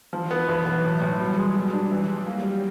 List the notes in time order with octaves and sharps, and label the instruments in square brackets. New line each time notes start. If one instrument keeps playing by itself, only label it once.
[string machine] E3 [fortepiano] F3
[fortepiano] B3
[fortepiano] B1 [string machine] F#3
[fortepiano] B3
A2
A2
[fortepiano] B2 [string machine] G3
[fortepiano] G#3
B2
D4
[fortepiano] E3 [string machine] F#3
[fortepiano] G#3
A#3
G3